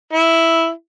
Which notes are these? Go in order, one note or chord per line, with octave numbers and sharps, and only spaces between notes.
E4